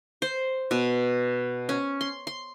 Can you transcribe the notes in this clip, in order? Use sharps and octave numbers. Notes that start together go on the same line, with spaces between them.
C5
B2
C#4
C6
C6